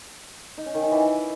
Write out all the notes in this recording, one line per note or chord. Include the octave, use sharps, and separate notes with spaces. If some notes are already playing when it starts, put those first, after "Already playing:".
D#4
C#4
D#3
D#4
E3